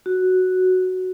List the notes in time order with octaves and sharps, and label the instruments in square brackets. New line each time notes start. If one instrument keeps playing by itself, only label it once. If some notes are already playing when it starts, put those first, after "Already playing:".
[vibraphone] F#4